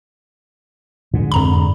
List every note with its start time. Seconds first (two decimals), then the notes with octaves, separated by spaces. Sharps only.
1.14 G#2 D3
1.32 F2 A#5 B5